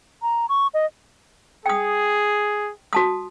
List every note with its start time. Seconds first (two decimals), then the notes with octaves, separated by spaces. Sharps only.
0.22 A#5
0.49 C#6
0.74 D#5
1.66 G#4 G5 D#6
2.93 F#4 A5 D#6